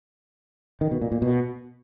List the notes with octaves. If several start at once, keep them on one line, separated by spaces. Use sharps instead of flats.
D#3
B2
A#2
A#2
B2